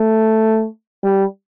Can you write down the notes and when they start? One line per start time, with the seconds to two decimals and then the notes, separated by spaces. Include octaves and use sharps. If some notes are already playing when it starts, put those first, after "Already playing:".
Already playing: A3
1.03 G3